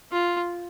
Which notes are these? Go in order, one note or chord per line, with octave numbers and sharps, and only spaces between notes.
F4